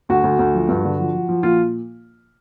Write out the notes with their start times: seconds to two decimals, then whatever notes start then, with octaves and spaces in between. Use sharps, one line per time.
0.09 D2 F#4
0.24 D2
0.39 D2
0.55 F3
0.68 G2
0.85 D3
0.99 F3
1.14 F3
1.29 F3
1.43 A#2 F4